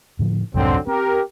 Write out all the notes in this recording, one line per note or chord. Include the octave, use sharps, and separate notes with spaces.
A2 D3 F3
C2 F2 G#2 D3 F#3 C4
C4 G4 A#4